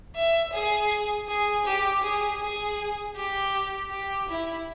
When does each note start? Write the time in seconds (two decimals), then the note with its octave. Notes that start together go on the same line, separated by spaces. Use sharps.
0.16 E5
0.53 G#4
1.28 G#4
1.66 G4
2.03 G#4
2.41 G#4
3.16 G4
3.91 G4
4.28 E4